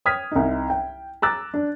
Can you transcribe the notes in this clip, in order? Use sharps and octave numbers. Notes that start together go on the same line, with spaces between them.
G5 D#6 F6 G#6 B6
C2 D#4
G5
A#5 D6 E6 F#6 A6
D4